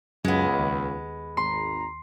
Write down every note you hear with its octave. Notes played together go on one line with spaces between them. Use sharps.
C#2 F#2 G#3 B3
D#2
G#1 A#5 C6